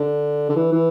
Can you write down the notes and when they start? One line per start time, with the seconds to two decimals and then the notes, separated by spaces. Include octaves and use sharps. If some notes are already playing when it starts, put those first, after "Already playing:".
Already playing: D3
0.49 D3
0.56 E3
0.73 E3